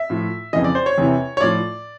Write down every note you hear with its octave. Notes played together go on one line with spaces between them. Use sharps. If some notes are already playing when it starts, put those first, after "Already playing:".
Already playing: E5
A2 F3
F2 C#3 E3 D#5
D5
C5
C#5
E2 C3 E3
C#5
A2 F3 D5